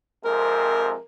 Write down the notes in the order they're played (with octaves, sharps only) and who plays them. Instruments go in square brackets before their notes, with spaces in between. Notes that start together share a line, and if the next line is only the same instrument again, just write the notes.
[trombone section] F2 C3 G#3 [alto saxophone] A#4